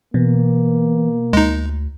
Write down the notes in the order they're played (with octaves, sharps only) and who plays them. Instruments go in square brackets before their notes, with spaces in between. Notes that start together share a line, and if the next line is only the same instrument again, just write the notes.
[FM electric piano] B2 [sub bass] E3 [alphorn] A#3
[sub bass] D2 [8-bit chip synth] G#3 D#4